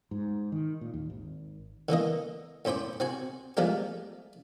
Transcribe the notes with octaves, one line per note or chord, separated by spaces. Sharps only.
G#2
D#3
A#2
D#2
G#1
D3 E3 A#3 D#5
A2 C#4 C5 B5 D6
C4 F#4 G#5
F3 G#3 A3 D4 G4